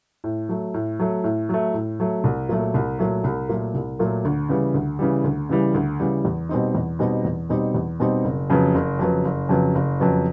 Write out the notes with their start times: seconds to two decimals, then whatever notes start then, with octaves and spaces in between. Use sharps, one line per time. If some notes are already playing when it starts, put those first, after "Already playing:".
0.24 A2
0.49 F#3 A3
0.74 A2
0.99 F#3 A3
1.24 A2
1.49 F#3 A3
1.74 A2
2.00 F#3 A3
2.24 C2
2.49 A#2 F#3 A3
2.74 C2
2.99 A#2 F#3 A3
3.24 C2
3.49 A#2 F#3 A3
3.74 C2
3.99 A#2 F#3 A3
4.25 D2
4.49 C#3 E3 G3
4.74 D2
4.99 C#3 E3 G3
5.24 D2
5.49 C#3 E3 G3
5.74 D2
6.00 C#3 E3 G3
6.25 E2
6.49 B2 G3 C4 D#4
6.75 E2
6.99 B2 G3 C4 D#4
7.25 E2
7.49 B2 G3 C4 D#4
7.75 E2
8.00 B2 G3 C4 D#4
8.24 F#1
8.50 F2 C#3 F#3 B3
8.75 F#1
8.99 F2 C#3 F#3 B3
9.25 F#1
9.49 F2 C#3 F#3 B3
9.75 F#1
10.00 F2 C#3 F#3 B3